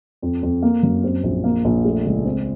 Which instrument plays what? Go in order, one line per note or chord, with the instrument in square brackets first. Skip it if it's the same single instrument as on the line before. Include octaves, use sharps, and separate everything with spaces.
[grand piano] F2
F2
A#3
F#2
C4
A#1
A#3
A#1
A3
C#2
C4